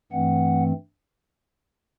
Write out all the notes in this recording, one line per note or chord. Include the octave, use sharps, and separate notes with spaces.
G2 E3 A3 C4 F#5